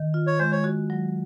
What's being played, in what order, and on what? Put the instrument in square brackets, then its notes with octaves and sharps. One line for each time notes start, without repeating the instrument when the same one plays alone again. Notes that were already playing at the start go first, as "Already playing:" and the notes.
Already playing: [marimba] D#3
F4
[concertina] C#5
[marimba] G#3 [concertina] C5
[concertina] C#5
[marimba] F#4
F#3